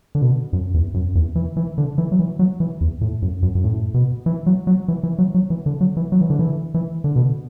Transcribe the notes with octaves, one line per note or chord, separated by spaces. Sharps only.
D3
B2
F#2
E2
F#2
E2
E3
E3
D3
E3
F#3
E3
F#3
E3
E2
A2
F#2
F#2
F#2
A2
B2
E3
F#3
F#3
E3
E3
F#3
F#3
E3
D3
F#3
E3
F#3
E3
D3
E3
E3
D3
B2